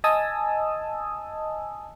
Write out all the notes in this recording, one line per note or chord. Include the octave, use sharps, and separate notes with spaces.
D#5 G#5 A5 D#6 E6